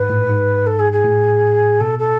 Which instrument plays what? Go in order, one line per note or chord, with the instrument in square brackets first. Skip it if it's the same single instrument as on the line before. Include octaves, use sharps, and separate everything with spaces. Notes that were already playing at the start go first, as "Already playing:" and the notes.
Already playing: [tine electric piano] G#2 [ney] B4
[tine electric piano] A2
G#2
[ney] A4
G#4
G#4
[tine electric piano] A2
[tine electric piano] B2 [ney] A4
[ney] A4